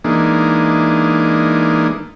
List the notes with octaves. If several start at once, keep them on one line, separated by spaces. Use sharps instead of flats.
E3 G#3 A#3 D4 D#4